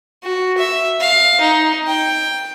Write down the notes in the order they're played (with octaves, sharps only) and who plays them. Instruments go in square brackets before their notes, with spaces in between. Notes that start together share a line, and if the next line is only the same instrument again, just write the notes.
[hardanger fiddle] F#4
E5
F5
D#4
G5